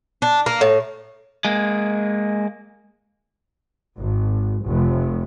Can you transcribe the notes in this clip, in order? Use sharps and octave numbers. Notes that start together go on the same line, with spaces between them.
D4
A#3
A2
G#3 A#3
G#1
F1